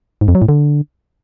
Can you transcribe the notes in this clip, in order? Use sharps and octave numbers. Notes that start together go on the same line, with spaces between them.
G#2
F2
F#3
A2
D3